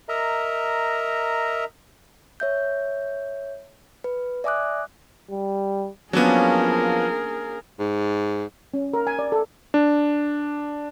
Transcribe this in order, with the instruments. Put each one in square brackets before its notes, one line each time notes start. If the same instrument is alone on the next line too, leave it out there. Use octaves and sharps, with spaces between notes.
[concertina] A#4 D#5 E5 A#5
[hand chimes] C#5 E5 G6
B4
D5 E5 G#5 D6 D#6 F#6
[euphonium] G3
[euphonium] F3 [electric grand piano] F#3 B3 [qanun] A#3 C#4 D4 [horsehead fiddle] G#4 A#4
[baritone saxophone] G#2
[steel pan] C#4
A#4
G#5
D5
A4
[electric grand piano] D4